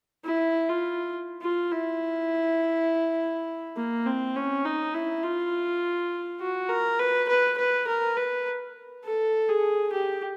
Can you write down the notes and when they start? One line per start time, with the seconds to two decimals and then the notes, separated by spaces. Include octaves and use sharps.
0.25 E4
0.69 F4
1.42 F4
1.71 E4
3.77 A#3
4.06 C4
4.36 C#4
4.65 D#4
4.94 E4
5.23 F4
6.41 F#4
6.69 A#4
6.99 B4
7.28 B4
7.58 B4
7.87 A#4
8.17 B4
9.05 A4
9.49 G#4
9.93 G4